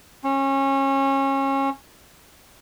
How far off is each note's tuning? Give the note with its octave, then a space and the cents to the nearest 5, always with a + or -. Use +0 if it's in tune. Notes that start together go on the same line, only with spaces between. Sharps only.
C#4 -25